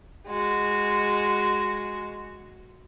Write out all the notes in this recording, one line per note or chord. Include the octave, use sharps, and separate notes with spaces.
G#3 F#4